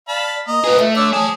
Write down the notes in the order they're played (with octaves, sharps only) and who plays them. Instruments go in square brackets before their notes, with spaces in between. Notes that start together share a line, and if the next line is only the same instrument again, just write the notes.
[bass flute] D5 [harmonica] F5 A5 B5
[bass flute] A#3 [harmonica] D#5 A#5
[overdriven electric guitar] F4 G#4 [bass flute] B4
[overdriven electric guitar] A3 [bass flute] E5
[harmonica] D3 D5 E6 [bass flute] C#5
[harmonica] G#4 [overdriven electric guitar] C5 A5